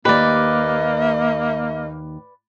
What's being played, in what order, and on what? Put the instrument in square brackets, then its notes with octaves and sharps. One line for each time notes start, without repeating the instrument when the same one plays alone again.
[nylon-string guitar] D#2 G4 [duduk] A#3 [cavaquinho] B4 D5 [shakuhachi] D#5